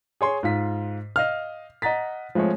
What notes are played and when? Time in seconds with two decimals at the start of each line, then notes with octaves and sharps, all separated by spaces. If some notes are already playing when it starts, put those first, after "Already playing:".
0.21 G#4 C#5 C6
0.43 G#2 F4 B6
1.16 D#5 F5 F6
1.82 D#5 F#5 A#5 A6 B6
2.35 F3 G#3 A3 C4 C#5